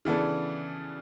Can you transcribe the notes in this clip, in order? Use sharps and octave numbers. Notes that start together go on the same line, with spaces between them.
C#3 E3 B3 D4 A4